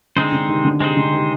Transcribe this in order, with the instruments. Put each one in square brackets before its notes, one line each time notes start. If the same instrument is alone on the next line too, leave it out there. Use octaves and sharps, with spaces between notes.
[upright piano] D3 [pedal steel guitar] G#3 C4 D#4 G#4 C5
[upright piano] D3
C3 D#3
D3
[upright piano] C3 [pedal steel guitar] G#3 C4 D#4 G#4 C5
[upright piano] D3
C3 D#3